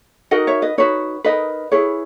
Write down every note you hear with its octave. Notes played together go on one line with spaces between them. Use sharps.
D#4 F#4 A#4 D#5 F#5
C#5 E5
B4 D#5
D#4 F#4 B4 C#5
D#4 F#4 A#4 B4 D#5
E4 G#4 B4 C#5